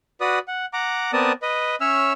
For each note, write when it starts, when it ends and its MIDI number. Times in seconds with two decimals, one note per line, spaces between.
0.21 0.39 66
0.21 0.39 71
0.21 0.39 74
0.21 0.39 87
0.48 0.66 78
0.73 1.12 78
0.73 1.12 82
0.73 1.12 86
1.13 1.32 59
1.13 1.32 60
1.13 1.32 70
1.13 1.32 74
1.13 1.32 81
1.13 1.32 87
1.42 1.76 71
1.42 1.76 75
1.81 2.13 61
1.81 2.13 73
1.81 2.13 76
1.81 2.13 88
1.81 2.13 89